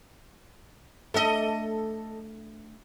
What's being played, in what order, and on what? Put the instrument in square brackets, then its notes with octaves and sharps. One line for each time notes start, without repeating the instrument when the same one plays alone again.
[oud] A3 D4 [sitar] A4 D#5